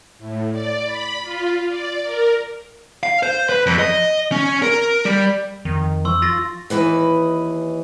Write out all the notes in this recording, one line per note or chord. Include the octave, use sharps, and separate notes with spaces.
A2
D5
B5
F4
D5
A#4
F5
C5
B4
F2
D#5
C#4
A#4
G3
F2 D#3
F3 C6 C#6 E6
F4 A6 A#6
D#2 B2 E3 B4 D#5